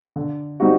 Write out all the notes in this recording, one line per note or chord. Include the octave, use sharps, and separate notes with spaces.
D3
G3 C4 D#4 F#4